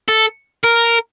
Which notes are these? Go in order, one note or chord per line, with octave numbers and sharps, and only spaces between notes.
A4
A#4